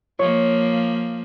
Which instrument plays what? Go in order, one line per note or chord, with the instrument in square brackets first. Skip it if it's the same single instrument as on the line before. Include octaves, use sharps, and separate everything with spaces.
[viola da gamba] F3 A#3 [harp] C#5